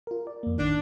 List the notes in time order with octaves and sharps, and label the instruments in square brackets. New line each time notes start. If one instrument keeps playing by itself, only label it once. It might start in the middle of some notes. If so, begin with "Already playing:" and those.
[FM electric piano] F4 A#4
D5
F2 A#3
[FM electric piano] A1 D#3 [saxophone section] D4